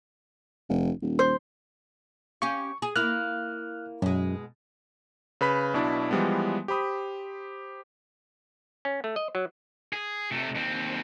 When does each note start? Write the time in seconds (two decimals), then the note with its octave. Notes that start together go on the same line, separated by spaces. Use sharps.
0.69 F1
1.02 D#1
1.19 C5
2.42 C#4 G4 F5 C#6
2.82 G#4
2.96 A#3 E4 F6 F#6
4.02 F#2 B2 G#3
5.41 C#3 B4 B5 B6
5.73 B1 B2 D4 E4
6.11 E3 F3 G3 G#3 B3
6.68 G4 C5 B5 D#6
8.85 C#4
9.04 A3
9.16 D#5
9.35 F#3
9.93 G#4
10.31 C3 A3
10.55 D#2 C4